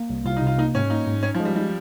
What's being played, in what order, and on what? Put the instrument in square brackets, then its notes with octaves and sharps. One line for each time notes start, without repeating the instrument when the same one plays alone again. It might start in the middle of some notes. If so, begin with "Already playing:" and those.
Already playing: [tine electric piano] A#3
C2
[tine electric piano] C2 [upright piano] F4
[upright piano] D#4
[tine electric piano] C3 [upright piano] F4
[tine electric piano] A#3 [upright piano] D#4
[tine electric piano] G#2 [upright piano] C#4
[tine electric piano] A#3 [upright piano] D#4
[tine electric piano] G#2
[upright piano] C#4 [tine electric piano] D#4
[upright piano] F3
[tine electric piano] G#3
[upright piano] G3
[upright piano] G3 [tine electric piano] G#3